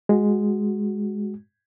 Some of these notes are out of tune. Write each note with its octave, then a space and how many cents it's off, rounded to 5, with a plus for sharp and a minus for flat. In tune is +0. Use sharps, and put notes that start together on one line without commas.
G#3 +0 F#4 +0